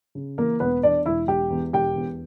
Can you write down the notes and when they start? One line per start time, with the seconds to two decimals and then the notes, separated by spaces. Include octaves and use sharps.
0.15 C#3
0.38 E3 A#3 A#4
0.60 E1 B3 B4
0.83 E2 D4 D5
1.06 E1 E4 E5
1.28 E1 G4 G5
1.50 E2
1.73 E1 G4 G5
1.95 E2